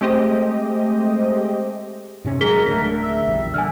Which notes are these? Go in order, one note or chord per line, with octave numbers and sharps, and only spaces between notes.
G#3 A3 C4 G4 C5 D#5
G#2 C3 C#4
F#3 G#3 G#4 A#4 B6 G7
D1 D3 A3 B6
E5
A#1 E2 G3
D3 G#5 F6